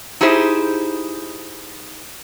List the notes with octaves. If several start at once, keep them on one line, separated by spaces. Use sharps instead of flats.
D#4 E4 G4 G#4 C5